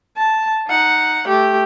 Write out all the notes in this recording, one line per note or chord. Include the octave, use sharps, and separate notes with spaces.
A5
D#4 F#5
A3 G4